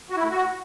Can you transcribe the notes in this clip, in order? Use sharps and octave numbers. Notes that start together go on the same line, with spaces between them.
F#4
E4
A3
F#4